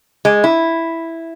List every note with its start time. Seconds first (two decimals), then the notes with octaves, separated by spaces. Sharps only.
0.25 G#3
0.44 E4